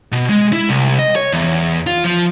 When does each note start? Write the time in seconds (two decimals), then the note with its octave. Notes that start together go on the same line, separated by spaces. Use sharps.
0.12 B2
0.29 G#3
0.53 E4
0.69 C2
0.99 D#5
1.16 C#5
1.33 E2
1.87 F4
2.04 F3